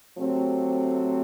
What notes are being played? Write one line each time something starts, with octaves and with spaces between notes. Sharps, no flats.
C3 F#3 A3 C4